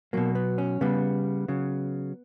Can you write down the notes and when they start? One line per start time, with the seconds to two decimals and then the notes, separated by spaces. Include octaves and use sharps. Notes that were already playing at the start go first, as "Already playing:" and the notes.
0.13 B2 F#3 A#3
0.35 B3
0.58 C#4
0.81 C#3 G3 B3
1.48 C#3 F#3